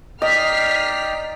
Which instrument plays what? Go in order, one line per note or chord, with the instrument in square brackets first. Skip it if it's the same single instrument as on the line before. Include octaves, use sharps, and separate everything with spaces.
[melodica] D#4 D5 G5 [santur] D#5 [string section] F6 B6 C7